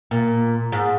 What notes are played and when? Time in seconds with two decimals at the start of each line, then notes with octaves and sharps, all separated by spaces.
0.11 A#2
0.72 G#2